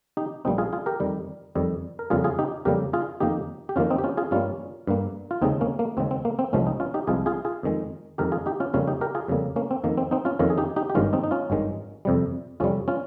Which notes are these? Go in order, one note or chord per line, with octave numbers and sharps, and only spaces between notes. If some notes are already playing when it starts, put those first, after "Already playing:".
D#4 G4
A#1 A#2 G3 A#3 C4 D#4
F4 G#4
F4 G#4
G4 A#4
F2 D#3 G3
F2 D#3 G3
A#4
F2 C#3 G3 A#3 F4 G#4
F4 G#4
D#4 G4
F2 C#3 G3 A#3 G4 A#4
F4 G#4
F2 D#3 A#3 D#4 G4
G4
F2 D#3 A#3 C#4 F4
C4 D#4
G4
C#4 F4
F4 G#4
G2 G3 A#3 C#4 F4
G2 G3 A#3
F4
D#2 C#3 G#3 C4 D#4
A#3 C#4
A#3
D#2 C#3 G#3 C4
C4
A#3
C4
C2 C3 F3 G#3 A#3 C#4
C4 D#4
C#4 F4
D#4 G4
C2 C3 F3 G#3 F4 G#4
F4 G#4
F4 G#4
F2 D#3 G#3
F2 D#3 G#3 G4 A#4
F4 G#4
D#4 G4
C#4 F4
F2 C#3 G3 A#3 C#4 F4
D#4 G4
G4 A#4
F4 G#4
F2 C#3 G3 A#3
A#3 C#4
C4
F2 D#3 A#3
C4
C4 D#4
C#4 F4
F2 D#3 A#3 C#4 F4
G#4
D#4 G4
D#4 G4
G4
G#1 G2 D#3 G#3 C#4 F4
C4 D#4
D#4
C#4 F4
G#1 G2 D#3 G#3
F2 C3 G3
F2 C3 G3 C#4 F4
C#4 F4